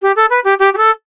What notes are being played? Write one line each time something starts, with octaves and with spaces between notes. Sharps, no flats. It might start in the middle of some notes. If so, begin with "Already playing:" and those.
G4
A4
B4
G4
G4
G4
A4